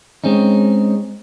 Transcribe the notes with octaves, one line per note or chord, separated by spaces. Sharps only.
G#3 C4 C#4 D#4